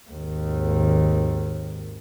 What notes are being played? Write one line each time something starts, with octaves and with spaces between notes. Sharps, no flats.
G#1 D#2